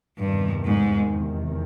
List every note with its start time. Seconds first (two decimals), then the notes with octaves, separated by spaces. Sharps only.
0.18 E2 G2 C3 D#3
0.64 G#2